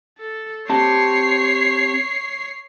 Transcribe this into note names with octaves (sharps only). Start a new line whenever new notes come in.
A4
C4 G4 C#5 A5 C7